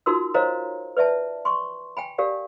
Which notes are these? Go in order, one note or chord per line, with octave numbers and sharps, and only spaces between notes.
D#4 F4 F#4 A#4 C6 E6
A#4 C5 C#5 D#5 F5 A#5
B4 D5 E5 A5
C6 C#6
G5 G#5 B5
G4 A#4 D5 F5